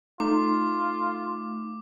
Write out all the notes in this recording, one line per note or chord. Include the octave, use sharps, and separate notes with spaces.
A3 D#4 F4 D6